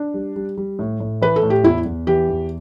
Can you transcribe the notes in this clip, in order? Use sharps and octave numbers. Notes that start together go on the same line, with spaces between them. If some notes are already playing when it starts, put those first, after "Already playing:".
Already playing: D4
G3
G3
G3
A2
A2
E3 B4
A4
A2
G4
E2 E4
E2
E3 G4
E2